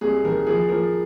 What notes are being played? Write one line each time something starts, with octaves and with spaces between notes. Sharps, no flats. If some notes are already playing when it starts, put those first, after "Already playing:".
C2 G#4
D#3 A#4
F3 G#4
F3 A#4